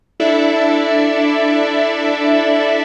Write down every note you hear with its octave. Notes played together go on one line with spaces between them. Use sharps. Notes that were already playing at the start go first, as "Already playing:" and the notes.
D4 E4 A4 D5 E5